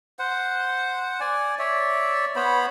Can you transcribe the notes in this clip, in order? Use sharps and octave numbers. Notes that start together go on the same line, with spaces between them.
C5 F#5
D5 G#5
C#5 D5 E5
B3 C5 C#5 B5